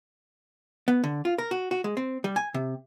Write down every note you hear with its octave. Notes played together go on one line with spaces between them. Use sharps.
B3
D3
F4
A#4
F#4
F#4
G#3
C4
G3
G#5
C3